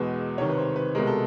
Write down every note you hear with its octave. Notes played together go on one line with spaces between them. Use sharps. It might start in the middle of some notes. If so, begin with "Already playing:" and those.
Already playing: E2 B2 G#3 B4
C2 C3 D#3 C#5
B4
C5
B4
C2 B2 G#3 A#4
A4